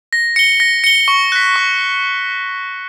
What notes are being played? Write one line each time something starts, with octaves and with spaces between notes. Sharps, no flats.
A#6
C#7 G7
A#6
C#7 G7
C#6
F#6 B6
C#6